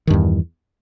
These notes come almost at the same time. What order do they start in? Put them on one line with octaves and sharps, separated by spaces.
D#3 G2 E2